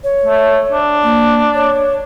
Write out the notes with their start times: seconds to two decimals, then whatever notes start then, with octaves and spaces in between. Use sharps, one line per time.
0.04 C#5
0.26 A3
0.72 D4
1.03 A#3
1.54 C#5